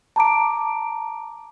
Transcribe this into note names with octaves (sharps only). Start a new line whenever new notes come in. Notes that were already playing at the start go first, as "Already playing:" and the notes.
A5 A#5 D6 D7